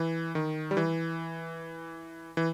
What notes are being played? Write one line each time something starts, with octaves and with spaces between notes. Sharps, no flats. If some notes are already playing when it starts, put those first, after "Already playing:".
Already playing: E3
D#3
G3
E3
E3